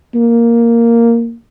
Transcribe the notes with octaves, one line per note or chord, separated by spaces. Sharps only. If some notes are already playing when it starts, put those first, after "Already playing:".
A#3